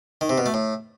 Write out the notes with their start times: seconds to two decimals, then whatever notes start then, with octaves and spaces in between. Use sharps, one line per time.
0.21 D#3
0.29 C3
0.38 B2
0.46 A3
0.54 A2